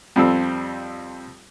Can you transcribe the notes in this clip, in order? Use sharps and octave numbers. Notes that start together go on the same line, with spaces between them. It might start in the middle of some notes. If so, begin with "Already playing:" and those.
F2 G3 C4 A4 E6